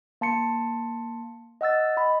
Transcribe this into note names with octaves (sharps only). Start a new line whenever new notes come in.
A#3 A5 C6 C#7
D#5 F#5 E6 A6
D#5 B5